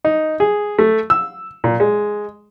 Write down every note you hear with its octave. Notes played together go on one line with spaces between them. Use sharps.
D#4
G#4
A3
E6
A#2
G#3